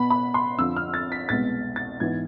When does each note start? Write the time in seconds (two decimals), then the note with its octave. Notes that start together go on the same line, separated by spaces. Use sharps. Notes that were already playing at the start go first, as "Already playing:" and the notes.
Already playing: B2 B3 B5
0.10 B5
0.34 C6
0.58 F2 D3 F3 E6
0.76 F6
0.94 A6
1.12 B6
1.29 C2 B2 G#3 B3 A6
1.76 A6
2.00 G#2 E3 B3 G#6